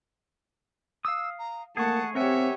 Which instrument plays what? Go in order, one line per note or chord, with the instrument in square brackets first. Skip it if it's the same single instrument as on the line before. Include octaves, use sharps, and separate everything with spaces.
[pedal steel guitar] F5 D#6 [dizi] E6
[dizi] A#5
[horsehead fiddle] A3 A5 [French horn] A#3 [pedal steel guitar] G#4 C#6 [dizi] F#5
[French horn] C4 [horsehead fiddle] G4 C#5 [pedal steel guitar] A#4 F#5 G#5 [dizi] E5